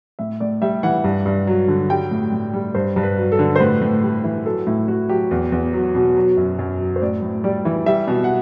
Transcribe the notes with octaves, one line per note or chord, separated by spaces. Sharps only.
A2 E5
A2 D5
G3 E5
E3 F#5
G2
G2
F#3
D3
G3 G5
A2
A2
G3
G2 C5
G2
B4
F#3
A4
D3
C5
A2 B4
A2
G3
E3
F#3 A4
A2 E4
A2 F#4
F#3 G4
E2
E2
F#3
B2
F#3
F#2
F#2
F#3
C5
A2 D5
A2
G3 D5
E3
G3 E5
B2
F#5